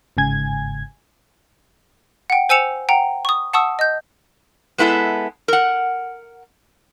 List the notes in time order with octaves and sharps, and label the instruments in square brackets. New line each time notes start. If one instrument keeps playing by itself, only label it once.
[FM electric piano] G1 G#2 C#3 G#5 G#6
[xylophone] F#5 G5
C5 G#5 E6 C#7 E7 F7
F#5 G5 A#5
C#6 D#6
F#5 A5 C#6 D#6 E6
D#5 G6
[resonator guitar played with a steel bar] G#3 B3 E4 A4 E5
A#4 F#5